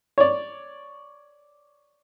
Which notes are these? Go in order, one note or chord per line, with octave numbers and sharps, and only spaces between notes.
C#5 D5